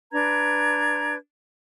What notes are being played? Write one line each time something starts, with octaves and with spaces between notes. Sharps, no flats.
D4 B4 A#5 G#6